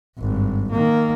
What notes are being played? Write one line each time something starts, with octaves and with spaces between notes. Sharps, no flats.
G#1 G2
D#3 A#3